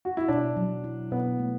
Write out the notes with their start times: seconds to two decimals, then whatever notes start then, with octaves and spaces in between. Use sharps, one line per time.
0.05 F#4
0.17 E4
0.28 B2 D4
0.56 F#3
0.84 E4
1.11 B2 B3
1.39 A3